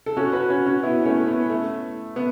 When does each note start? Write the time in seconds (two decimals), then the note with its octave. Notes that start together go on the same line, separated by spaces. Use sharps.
0.06 A4
0.17 C#4 F#4
0.33 F#4 B4
0.50 C#4 F#4
0.66 C#4 F#4
0.83 B3 E4
1.05 A3 C#4
1.27 B3
1.50 A3
2.16 B3